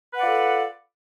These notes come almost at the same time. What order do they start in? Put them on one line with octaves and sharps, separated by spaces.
B4 F#5 D5 F4 A4